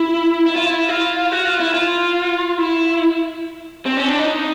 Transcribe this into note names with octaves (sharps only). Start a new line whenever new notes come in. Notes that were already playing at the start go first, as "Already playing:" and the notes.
Already playing: E4
E4
F4
E4
F4
F#4
F4
E4
F4
E4
C4
C#4
D4
D#4